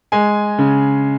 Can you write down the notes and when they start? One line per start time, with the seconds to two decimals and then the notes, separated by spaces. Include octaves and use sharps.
0.12 G#3 G#5
0.58 C#3